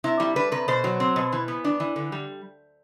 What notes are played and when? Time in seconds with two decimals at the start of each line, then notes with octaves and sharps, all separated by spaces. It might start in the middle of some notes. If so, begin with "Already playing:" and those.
0.04 C3 E4
0.20 G3 E4
0.36 D4 B4
0.52 C3 B4
0.68 B2 C5
0.84 F#3
1.00 C4
1.16 B2
1.32 E3
1.48 B3
1.65 D4
1.80 E3
1.96 D3
2.12 G3